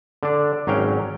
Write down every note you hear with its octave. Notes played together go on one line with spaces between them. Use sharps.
D3 D4
G#1 F#3 C#4 F5 G5